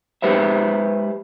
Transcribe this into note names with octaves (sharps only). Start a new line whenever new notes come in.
G#3 G4 B4 C5 E5